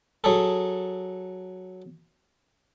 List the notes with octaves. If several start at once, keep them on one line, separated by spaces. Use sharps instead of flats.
F#3 G#4 A4